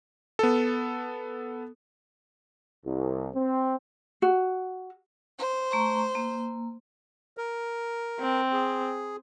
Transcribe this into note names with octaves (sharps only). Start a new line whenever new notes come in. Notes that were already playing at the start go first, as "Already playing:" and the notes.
B3 A4
C2
C4
F#4
C5
A3 A#5 C#6
A#3
A#4
C4
G#4